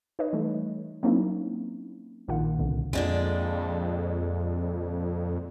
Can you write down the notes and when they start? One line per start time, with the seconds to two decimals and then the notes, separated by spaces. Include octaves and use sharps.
0.19 D#4 B4 C#5 D#5
0.33 E3 G3 A3
1.03 F#3 A#3 C4 C#4 D#4 E4
2.28 A#1 A#2 D#3 F4 F#5
2.59 C2 B2 D3
2.93 F2 A#2 D3 G#3